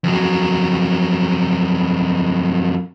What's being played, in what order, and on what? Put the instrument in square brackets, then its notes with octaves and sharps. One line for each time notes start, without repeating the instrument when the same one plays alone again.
[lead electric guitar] F2 F#3